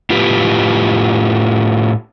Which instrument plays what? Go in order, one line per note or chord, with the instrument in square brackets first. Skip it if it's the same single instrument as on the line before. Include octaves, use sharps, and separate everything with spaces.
[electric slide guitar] A2 F4 G4 B4